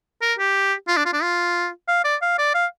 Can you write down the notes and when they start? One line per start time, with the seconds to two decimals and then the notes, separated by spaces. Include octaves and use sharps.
0.22 A#4
0.39 G4
0.88 F4
0.97 D4
1.06 F4
1.13 D4
1.22 F4
1.88 F5
2.04 D5
2.22 F5
2.38 D5
2.54 F5